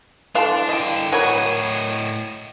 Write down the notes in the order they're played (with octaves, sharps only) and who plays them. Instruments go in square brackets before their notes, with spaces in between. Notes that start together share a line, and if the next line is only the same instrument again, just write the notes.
[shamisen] E3 A4 [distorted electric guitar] D4 [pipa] F5 C6
[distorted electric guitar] D3 G5 [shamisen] E4 D#5
[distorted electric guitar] A2 D#5 [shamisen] E3 A#4 B5 [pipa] F#3 C#5